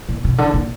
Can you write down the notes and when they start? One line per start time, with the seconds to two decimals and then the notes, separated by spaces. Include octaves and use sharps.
0.09 A#2
0.24 B2
0.38 D3
0.54 A#2